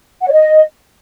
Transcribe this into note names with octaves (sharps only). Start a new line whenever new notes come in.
F#5
C#5
D#5